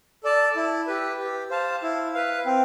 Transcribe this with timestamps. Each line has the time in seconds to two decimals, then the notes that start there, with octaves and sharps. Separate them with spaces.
0.24 A4 D5 A5
0.56 E4
0.87 G4 B4
1.18 G4
1.50 C5 F5 A5
1.83 E4
2.14 B4 F5
2.46 C4